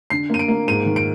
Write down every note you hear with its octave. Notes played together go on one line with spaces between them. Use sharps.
D3 C7
A#3 D#7
D7
A#3
G#2 D#7
D#3
D7